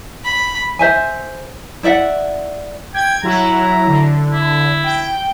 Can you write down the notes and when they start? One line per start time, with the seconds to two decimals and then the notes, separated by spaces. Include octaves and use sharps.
0.24 B5
0.79 C5 E5 G#5
1.83 E4 D5 E5 F#5
2.94 G5 G#6
3.23 F#3 E4 A#5
3.87 D3
4.31 E4
4.84 G5